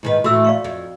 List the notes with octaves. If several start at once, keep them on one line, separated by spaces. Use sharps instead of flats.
G#2 D#3 B4
A2 E3 A3 F#4 E6
D5 F5 C#6
F2